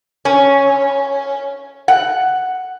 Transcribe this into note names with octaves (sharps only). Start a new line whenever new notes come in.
C#4
F#5